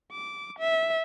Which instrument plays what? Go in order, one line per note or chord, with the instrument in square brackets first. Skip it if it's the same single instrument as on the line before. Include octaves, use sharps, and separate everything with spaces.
[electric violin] D6
E5